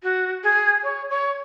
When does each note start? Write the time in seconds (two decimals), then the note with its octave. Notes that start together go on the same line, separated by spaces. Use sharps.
0.03 F#4
0.44 G#4
0.84 C#5
1.10 C#5